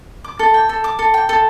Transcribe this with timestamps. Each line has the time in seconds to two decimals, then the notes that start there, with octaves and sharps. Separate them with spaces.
0.24 D6
0.39 A4
0.54 G5
0.69 A4
0.84 D6
0.99 A4
1.14 G5
1.29 A4